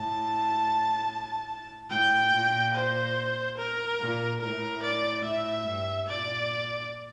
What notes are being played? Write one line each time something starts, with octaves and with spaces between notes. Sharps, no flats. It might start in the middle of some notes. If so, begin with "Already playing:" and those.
Already playing: A2 A5
A2 G5
A#2
C5
A#4
A#2
A2 A#4
D5
A2 E5
G2
A#2 D5